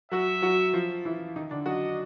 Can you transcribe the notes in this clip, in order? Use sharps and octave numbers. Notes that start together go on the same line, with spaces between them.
F#3 F#4 E5
F#3 F#4
F3 F4
E3 E4
D#3 D#4
D3 D4
F#3 F#4 D#5